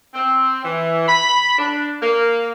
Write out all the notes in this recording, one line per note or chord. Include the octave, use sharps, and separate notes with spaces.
C4
E3
B5
D4
A#3